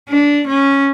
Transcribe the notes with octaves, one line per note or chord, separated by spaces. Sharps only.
D4
C#4